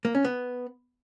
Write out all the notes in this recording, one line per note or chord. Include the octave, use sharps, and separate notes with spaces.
A#3
C#4
B3